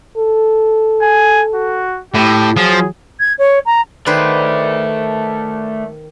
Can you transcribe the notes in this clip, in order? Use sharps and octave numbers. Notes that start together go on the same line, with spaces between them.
A4
G#5
F#4
A2 G4
F3 F#3 G#4
G#6
C#5
A#5
D#3 A3 B4 C5 D5